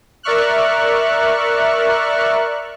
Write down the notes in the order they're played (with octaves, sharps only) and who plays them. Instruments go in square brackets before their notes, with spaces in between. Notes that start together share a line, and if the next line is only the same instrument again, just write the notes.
[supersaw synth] A#4 D5 E5 C#6 F6 F#6